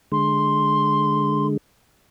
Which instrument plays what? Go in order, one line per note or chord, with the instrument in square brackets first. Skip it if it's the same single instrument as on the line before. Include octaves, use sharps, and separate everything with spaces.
[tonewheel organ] D3 G#3 [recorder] C6